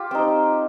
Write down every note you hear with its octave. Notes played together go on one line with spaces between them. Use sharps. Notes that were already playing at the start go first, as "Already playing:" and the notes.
Already playing: F4 G4
C4 D#4